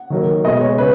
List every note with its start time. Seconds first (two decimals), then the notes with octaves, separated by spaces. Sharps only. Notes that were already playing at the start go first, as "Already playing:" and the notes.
Already playing: F#5
0.10 D#3 F#3 A#3
0.44 B2 G#3 D#5
0.61 C#5
0.78 C#3 B4